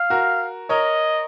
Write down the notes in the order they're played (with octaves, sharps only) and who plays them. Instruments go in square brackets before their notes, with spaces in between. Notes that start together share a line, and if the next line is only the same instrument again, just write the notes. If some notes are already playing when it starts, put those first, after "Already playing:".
Already playing: [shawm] F5
[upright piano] F#4 A#4
[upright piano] A#4 C#5 [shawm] D#5